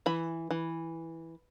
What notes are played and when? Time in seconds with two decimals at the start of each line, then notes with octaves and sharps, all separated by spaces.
0.06 E3 B5
0.51 E3